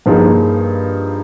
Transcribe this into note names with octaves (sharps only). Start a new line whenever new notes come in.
G2 F3 A#3 D#4 G#4